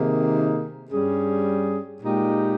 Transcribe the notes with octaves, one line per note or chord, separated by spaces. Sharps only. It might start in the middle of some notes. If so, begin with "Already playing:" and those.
Already playing: C3 D#3 A#3 D#4 G#4
G2 G3 C#4 G#4
A#2 G#3 D#4 G4